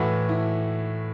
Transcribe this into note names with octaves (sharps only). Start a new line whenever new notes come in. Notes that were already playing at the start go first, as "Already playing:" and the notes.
Already playing: A2 E3 A3 F#4
E4